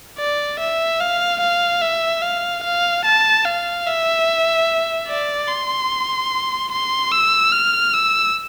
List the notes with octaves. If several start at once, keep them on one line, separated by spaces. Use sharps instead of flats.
D5
E5
F5
F5
E5
F5
F5
A5
F5
E5
D5
C6
C6
E6
F6
E6